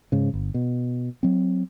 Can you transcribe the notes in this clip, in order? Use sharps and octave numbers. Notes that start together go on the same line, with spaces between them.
G#2 C#3
G1
B2
F#3 C4